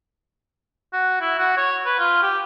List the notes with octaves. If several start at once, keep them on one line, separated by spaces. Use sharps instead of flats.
F#4
E4
F#4
C#5
B4
F4
G4